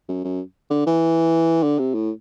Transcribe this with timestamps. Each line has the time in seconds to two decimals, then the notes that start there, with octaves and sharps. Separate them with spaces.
0.09 F#2
0.24 F#2
0.70 D3
0.86 E3
1.63 D3
1.79 C3
1.94 A2